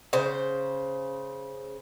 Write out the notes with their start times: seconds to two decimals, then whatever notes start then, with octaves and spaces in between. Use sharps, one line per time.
0.13 C#3 C5